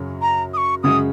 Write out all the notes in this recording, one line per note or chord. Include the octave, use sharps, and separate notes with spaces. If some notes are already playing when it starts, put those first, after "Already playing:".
Already playing: F#2 C#3 F#3 C#4
A#5
D#6
C#6
F#2 C#3 G#3 C#4 F#4 D#6